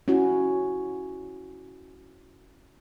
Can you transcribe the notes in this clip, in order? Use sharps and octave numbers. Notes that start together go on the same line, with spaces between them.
C#4 E4 F#4